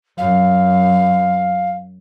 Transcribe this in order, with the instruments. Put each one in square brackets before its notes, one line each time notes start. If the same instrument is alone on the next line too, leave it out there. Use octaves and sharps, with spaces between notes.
[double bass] F#2 [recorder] F5